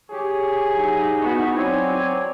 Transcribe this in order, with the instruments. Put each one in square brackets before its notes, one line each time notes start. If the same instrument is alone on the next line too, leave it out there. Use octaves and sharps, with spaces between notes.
[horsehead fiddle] G4 C#5 [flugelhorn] G#4
[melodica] F#3 [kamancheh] D#4 E4
[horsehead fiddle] B3 F#4 [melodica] C#6
[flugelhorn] F#3 [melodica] C4 G#5 [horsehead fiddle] C#5 D5